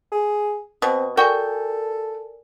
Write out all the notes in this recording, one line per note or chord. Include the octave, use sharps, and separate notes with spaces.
G#4
B2 C4 D#6
F#4 A4 A#4 D5 G5 G#5